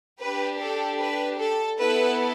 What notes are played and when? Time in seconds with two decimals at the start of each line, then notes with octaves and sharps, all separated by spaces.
0.20 D4 G4 B4
0.60 A4
1.00 B4
1.40 A4
1.80 B3 E4 A4 B4